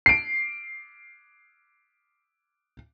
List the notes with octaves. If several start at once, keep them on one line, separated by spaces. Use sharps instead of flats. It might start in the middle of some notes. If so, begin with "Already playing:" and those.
C7 D7